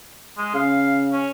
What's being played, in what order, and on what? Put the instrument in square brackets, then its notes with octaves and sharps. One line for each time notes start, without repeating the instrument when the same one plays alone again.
[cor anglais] G#3
[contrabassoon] C#3 [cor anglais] F5
[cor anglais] C#4